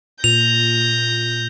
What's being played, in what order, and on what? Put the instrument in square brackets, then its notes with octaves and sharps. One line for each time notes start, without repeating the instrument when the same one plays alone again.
[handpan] A#2 [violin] G6 A#6 [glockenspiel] F7